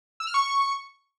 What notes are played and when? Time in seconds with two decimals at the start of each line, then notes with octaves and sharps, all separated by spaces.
0.20 E6
0.27 F6
0.34 C#6